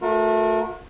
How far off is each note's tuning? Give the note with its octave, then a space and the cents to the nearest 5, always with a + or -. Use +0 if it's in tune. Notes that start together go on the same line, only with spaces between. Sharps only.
A3 +0 F#4 -40 A#4 +0